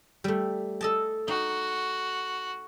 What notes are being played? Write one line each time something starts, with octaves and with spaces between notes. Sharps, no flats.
G3 A3
A4 D#5 A5
D#4 F#4